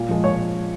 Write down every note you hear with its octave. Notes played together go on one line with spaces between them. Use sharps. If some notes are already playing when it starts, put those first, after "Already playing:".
Already playing: A#2
F3 G#3
A#2 C#5